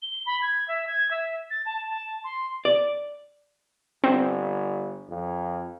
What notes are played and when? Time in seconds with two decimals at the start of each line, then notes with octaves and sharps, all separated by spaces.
0.02 G7
0.26 B5
0.42 G#6
0.68 E5
0.87 G#6
1.11 E5
1.50 A6
1.66 A5
1.89 A5
2.24 C6
2.65 D5
4.04 G1 C4
5.09 F2